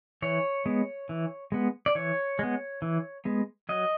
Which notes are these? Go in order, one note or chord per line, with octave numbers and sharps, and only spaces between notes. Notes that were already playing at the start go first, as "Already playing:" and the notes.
E3 C#5
G#3 B3
E3
G#3 B3
D5
E3 C#5
G#3 B3
E3
G#3 B3
F#3 D#5